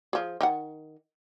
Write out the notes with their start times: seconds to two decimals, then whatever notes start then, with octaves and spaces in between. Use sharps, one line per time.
0.13 F3 G#4
0.41 D#3 F#5